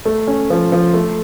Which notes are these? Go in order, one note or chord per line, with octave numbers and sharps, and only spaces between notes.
A3
C#4
F3
F3
A3